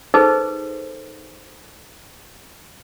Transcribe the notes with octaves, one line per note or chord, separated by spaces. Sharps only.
D#4 G#4 A4 B4 C5